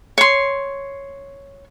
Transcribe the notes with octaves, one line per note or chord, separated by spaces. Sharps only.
C#5 C6